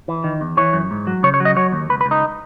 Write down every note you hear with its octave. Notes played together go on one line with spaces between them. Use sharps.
E3
D#3
E2
E3 C#5
F#2
G#2
F#3
C#3 C#5
C#5
F#3
D#5
F#3 C#5
D#2
C#2 B4
B4
C#2
D#4